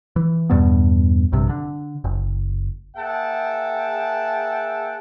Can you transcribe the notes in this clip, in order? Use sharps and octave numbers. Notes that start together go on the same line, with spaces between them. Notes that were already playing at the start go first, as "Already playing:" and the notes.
E3
E2 G2 B2 B3
A#1 G2 C3
D3
F#1
A#3 G#4 E5 F#5 G5 A5